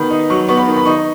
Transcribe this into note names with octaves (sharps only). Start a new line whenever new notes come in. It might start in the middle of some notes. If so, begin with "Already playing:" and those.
Already playing: D#3 B3 B5
D#4
F#3 C#6
B3 C#6
B5
D#3
B5
D#4 C#6